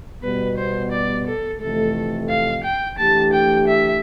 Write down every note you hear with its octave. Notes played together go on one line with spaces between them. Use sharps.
B2 G3 B3 B4
C5
D5
A4
F2 C3 E3 A3 A4
F5
G5
E3 A3 D4 G4 A5
G5
E5